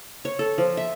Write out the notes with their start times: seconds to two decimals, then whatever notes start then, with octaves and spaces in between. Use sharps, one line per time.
0.25 C#5
0.39 A4
0.58 F3
0.77 E5